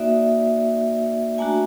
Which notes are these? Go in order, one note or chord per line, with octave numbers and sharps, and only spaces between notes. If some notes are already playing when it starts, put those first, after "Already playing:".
Already playing: A#3 D#4 F#4 D5 E5
A3 D4 F#4 G#5 A#5